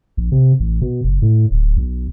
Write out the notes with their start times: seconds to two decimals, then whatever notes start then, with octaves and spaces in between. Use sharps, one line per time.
0.17 A#1
0.32 C3
0.60 A1
0.81 B2
1.04 F#1
1.22 A2
1.51 D1
1.77 B1